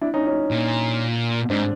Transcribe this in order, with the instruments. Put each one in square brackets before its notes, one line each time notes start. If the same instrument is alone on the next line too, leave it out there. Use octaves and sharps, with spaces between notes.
[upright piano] D4 E4
C#4 D#4
C#4 D#4
[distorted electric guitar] A#2
[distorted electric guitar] G#2 [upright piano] C4 D4